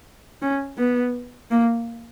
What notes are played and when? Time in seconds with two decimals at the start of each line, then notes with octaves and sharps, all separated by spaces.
0.42 C#4
0.78 B3
1.51 A#3